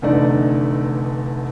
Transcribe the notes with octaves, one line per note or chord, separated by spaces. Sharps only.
F1 E2 D3 A3 D#4 D5